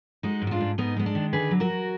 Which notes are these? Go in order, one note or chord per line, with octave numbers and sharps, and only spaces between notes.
G#3 D#4 F#4
G#2
F#4
D4 F4
G#2
G#2 B3 D#4
G#3 B3
D4
D#3
D3 G#4 B4
F#3
F#4 A#4
F#3